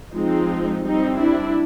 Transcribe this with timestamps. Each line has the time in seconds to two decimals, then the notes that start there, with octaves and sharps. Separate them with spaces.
0.11 F3 G#3 C4 D#4
0.81 G3 C4 D#4
1.17 D4 E4